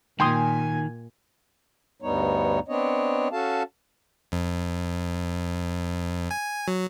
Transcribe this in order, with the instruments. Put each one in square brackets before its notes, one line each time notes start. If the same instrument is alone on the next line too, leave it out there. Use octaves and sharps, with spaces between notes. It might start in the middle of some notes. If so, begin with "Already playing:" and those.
[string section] A#2 [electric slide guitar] D#3 [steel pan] G5 C6 D#6 [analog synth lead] G#5
[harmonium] D2 G2 G3 B3 D#4 C#5
B3 C4 D4 C#5 D#5
C#4 F#4 A4 F5 A5
[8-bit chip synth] F2
G#5
F#3